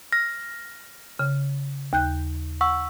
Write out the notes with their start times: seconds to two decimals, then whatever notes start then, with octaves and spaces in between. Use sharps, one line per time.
0.12 F6 A#6
1.19 C#3
1.93 D#2 F#6 G6
2.61 F#5 C#6 E6